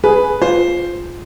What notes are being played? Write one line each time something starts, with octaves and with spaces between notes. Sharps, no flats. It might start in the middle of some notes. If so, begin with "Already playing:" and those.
G#4 B4
F4 C5